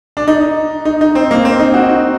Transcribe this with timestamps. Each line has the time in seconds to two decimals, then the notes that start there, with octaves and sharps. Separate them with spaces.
0.17 D4
0.28 D#4
0.85 D#4
1.01 D#4
1.15 C4
1.31 A#3
1.45 C4
1.59 D#4
1.74 F#4
1.89 D#4